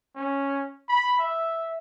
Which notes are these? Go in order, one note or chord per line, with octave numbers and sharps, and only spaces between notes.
C#4
B5
E5